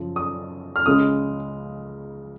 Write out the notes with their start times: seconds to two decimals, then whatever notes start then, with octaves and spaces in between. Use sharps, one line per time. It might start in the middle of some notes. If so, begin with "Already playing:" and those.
Already playing: F#2 C#3 F3
0.16 D#6
0.76 F6
0.86 C#2 C#3 G#3 D#6